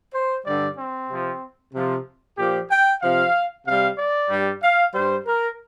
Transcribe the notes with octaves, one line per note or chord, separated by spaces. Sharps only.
C5
G2 D3 G3 D5
C4
C3 F3
C3 F3
A#2 F3 G4
G5
C3 F3 F5
C3 G3 F5
D5
G2 G3
F5
G2 G3 C5
A#4